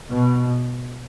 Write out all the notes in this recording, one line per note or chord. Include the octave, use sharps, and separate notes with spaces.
B2